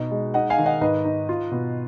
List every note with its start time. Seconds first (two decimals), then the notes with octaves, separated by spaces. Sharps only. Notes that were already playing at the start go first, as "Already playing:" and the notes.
Already playing: B2 D#4
0.11 G#3
0.34 D#4 D#5 F#5
0.50 F5 G#5
0.58 D#3
0.66 D#5 F#5
0.81 G#2 B4 D#5
1.05 D#4
1.29 F4
1.52 B2